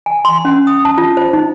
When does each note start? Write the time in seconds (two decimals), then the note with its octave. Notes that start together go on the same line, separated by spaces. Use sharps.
0.06 G#5
0.25 C6
0.45 C#4
0.67 D#6
0.85 A5
0.98 F4
1.17 C5
1.33 D#4